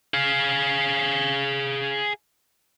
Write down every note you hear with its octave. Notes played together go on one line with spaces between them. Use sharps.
G#4 F5